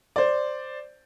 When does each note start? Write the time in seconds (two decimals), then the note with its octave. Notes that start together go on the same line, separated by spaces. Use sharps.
0.16 C5 D5